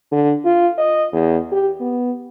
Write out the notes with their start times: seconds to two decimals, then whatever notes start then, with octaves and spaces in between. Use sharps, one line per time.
0.12 D3
0.45 F4
0.78 D#5
1.12 E2
1.52 G4
1.80 B3